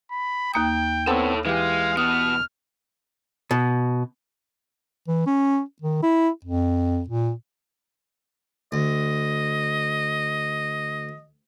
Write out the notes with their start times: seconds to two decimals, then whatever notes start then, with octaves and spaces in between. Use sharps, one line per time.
0.11 B5
0.54 D#2 A#3 G5 D#6
1.07 B3 C4 A4 C#5
1.46 E3 G#3 G4 F5
1.97 B2 B3 D#6 F6
3.51 B2
5.08 E3
5.27 C#4
5.82 D#3
6.03 E4
6.45 F2
7.08 A#2
8.72 D2 D#5